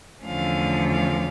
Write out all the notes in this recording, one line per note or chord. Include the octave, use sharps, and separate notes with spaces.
E2 D3 F3 A3 C#4 F5
F5